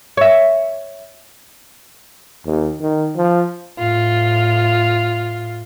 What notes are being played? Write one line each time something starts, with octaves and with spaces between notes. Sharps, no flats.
C#5 E5
D#2
D#3
F3
A2 F4